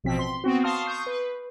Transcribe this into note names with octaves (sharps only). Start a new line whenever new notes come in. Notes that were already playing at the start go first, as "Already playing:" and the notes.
A1 B2 F3 C4 B6
C6
B3 C4 F#4
F5 A5 C6 C#6 D#6 F6
C#6 D#6 G6 C7
B4